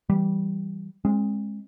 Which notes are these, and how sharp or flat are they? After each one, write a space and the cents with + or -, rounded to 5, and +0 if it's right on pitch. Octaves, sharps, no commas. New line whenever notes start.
E3 +0 G3 -10
G#3 +0 C#4 -45